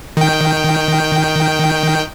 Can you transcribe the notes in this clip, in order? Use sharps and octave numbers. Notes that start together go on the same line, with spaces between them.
D#3 G5